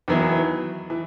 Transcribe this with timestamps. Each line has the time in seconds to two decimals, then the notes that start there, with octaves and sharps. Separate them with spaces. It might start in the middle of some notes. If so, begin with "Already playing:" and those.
0.08 E2 D#3 F#3 B3 E4
0.90 E3